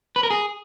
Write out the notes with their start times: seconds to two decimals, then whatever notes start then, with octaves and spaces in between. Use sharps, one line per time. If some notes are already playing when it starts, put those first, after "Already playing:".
0.16 B4
0.23 A#4
0.30 G#4